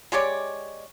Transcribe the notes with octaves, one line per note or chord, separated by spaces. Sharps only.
G#3 G4 C#5 D5